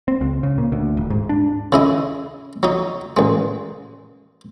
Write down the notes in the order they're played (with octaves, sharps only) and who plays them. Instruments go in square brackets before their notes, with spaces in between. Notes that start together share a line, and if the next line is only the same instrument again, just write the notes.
[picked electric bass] C4
C#2
C#3
A#2
D2
D#1
G#2
D4
[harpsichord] C#3 E4 D#5
F#3 D#4
A1 G#3